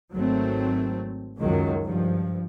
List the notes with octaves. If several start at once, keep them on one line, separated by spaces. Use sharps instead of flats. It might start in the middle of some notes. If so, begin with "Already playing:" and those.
G#1 F#3 A3 C4
C#2 F#2 D#3 F#3
G2 F3